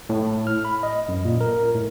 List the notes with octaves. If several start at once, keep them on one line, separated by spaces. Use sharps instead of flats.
A2
F6
B5
D#5
F#2
A#2
A#4
A2